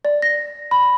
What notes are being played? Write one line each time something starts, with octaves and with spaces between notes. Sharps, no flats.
D5
A#6
B5